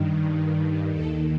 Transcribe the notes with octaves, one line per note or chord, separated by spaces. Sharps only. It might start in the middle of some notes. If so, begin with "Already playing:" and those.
Already playing: G2 D#3
D#2 D#3 A4